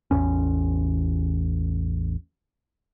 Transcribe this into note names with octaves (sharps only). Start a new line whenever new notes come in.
A1 E2 G#2 C#4